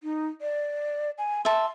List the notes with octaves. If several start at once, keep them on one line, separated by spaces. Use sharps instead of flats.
D#4
D5
G#5
E5 A5 C6